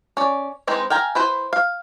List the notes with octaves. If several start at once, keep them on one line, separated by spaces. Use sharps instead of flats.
C#4 D5
E3 G#3 C4 D#4
F5 G5 G#5 A#5
E4 B4 C5
F5